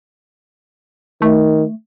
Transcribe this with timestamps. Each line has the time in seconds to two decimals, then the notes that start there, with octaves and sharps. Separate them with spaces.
1.22 D#3 A3